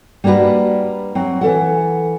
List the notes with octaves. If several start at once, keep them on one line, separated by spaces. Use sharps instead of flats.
G3 A#3 D4 F#4 B4
F#3 C4
E3 A4 F#5